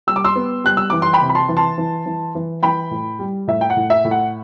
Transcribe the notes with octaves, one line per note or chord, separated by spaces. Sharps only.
G3 E6
D6
C6 E6
B3
G3 F#6
E6
E3 D6
C6
G5 B5
C3
B5
A5 C6
E3
A5 C6
E3
E3
E3
E3 G5 B5
A2
G3
A2 E5
G5
F#5
A2
E5
A2
F#5